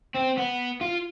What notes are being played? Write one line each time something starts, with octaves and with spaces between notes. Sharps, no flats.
C4
B3
F4